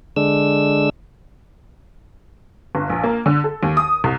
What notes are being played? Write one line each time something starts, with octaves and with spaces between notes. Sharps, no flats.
D3 G#3 D4 E6
G1
A#1
A#3
D3
A4
D#2
D#6
C2